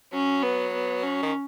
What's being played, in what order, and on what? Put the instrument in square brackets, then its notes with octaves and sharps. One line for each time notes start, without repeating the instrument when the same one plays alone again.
[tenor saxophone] F#3 [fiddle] C#4
[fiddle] B3
B3
C#4
[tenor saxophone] D#3